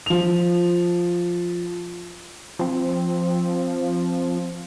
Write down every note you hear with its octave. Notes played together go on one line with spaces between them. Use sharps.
F3 F7
F3 C4